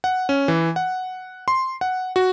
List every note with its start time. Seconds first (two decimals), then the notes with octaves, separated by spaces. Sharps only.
0.04 F#5
0.29 C#4
0.48 E3
0.76 F#5
1.48 C6
1.81 F#5
2.16 F#4